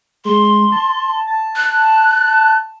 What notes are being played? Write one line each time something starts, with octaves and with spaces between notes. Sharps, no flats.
G#3 C6
A5
A5
F#6